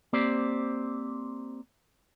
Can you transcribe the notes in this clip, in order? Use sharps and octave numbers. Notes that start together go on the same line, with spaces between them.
A#3 C4 G4 C5 D5